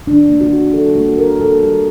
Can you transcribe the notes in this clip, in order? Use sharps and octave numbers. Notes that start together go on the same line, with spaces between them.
D#3 D4
A#3
F#4
A#3
G3 A4
A#3 F#4
A#3 A#4
A#3 A4
G3 G4